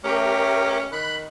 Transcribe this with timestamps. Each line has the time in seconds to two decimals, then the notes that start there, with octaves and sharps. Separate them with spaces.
0.04 A3 C#4 G4 A#4
0.92 D#3 B5 F#6